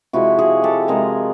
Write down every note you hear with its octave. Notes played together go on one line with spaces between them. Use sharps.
C3 F3 G#3 E4 F#4
F#4 G#4
G4 A4
C3 F3 G#3 G#4 A#4